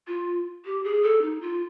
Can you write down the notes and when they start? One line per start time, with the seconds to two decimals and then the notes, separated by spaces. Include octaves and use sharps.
0.07 F4
0.65 G4
0.84 G#4
1.03 A4
1.22 D#4
1.41 F4